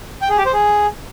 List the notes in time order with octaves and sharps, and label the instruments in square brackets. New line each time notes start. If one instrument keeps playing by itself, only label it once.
[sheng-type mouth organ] G5
G#4
G4
C5
G#4